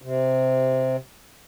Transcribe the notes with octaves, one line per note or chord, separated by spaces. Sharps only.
C3